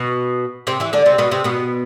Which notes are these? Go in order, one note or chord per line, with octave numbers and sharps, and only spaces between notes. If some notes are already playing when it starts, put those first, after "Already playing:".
Already playing: B2 B3
C3 C4
E3 E4
D3 D4
C3 C4
B2 B3
C3 C4
B2 B3